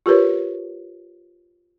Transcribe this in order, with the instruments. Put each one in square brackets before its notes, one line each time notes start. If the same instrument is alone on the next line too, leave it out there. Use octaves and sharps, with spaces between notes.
[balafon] F4 G4 A#4 B4 C#5